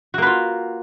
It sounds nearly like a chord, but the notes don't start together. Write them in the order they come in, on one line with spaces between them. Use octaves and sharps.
F#4 A#3 B4 F4